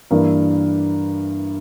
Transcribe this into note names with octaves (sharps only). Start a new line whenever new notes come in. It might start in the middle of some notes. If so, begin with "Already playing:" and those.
G2 E3 A#3